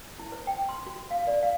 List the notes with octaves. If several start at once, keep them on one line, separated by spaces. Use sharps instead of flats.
E4
C5
G5
C6
F#4
F5
D5
F5